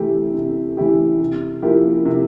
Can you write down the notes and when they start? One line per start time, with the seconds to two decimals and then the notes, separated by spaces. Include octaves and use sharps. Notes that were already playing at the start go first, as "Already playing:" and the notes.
Already playing: C3 E3 A3 E4 G4
0.34 C3
0.77 E3 A3 E4 G4
1.20 C3
1.62 F3 A#3 E4 G4
2.05 C3